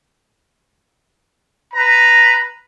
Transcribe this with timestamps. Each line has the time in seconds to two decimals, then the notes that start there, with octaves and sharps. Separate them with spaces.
1.74 B4 A#5